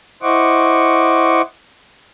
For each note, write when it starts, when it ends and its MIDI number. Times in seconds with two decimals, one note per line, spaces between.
0.22 1.42 64
0.22 1.42 72
0.22 1.42 75
0.22 1.42 78
0.22 1.42 85
0.22 1.42 86